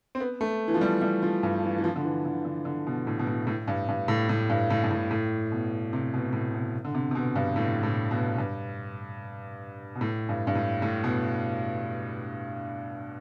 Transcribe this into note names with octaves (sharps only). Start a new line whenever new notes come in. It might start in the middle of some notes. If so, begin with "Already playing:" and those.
C4
B3
A3
E3
F3
G3
G3
F3
G2
E3
E3
F3
D3
E3
D3
D3
D3
B2
A2
B2
A2
A2
G2
G2
A2
A2
G2
A2
G2
A2
A2
B2
C3
B2
A2
B2
D3
C3
C3
B2
G2
A2
A2
B2
G2
B2
A2
G2
G2
A2
A2
B2